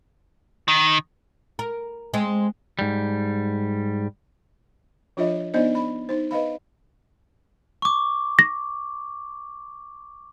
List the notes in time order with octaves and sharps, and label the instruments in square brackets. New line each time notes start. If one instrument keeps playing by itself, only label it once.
[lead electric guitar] D#3
[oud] A#4
G#3 C4
[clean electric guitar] G#2 G3
[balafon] F3 D4 F4 C#5 D#5 E5
B3 D4 D#4 C5 D5 D#5
B5
D#4 C5
B4 D#5 F5 B5
[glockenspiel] C#6 D6
[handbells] A#6